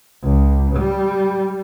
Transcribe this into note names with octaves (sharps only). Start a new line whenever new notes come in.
C#2
G3